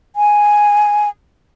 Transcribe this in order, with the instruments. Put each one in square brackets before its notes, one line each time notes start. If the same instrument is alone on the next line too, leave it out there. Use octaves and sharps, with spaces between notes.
[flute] G#5